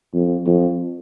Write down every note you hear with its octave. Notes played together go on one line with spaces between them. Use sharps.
F2
F2